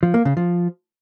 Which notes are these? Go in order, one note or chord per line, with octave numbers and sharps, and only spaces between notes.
F3
A#3
C#3
F3